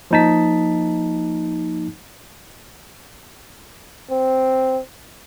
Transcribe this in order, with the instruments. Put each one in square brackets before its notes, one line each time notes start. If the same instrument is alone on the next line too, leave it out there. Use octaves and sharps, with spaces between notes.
[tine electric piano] F3 A#3 D#4 A5 B6
[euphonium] C4